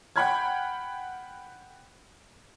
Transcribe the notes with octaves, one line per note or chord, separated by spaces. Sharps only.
F#5 G5 B5 F6 G#6